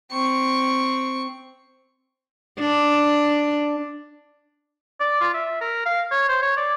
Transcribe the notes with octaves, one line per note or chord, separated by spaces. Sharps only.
C4 C#6
D4
D5
F4
E5
A#4
F5
C#5
C5
C#5
D5